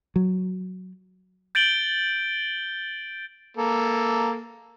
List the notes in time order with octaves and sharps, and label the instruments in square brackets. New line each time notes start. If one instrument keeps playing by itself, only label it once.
[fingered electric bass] F#3
[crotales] G6 A6 D7 F#7 G7
[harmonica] A#3 A4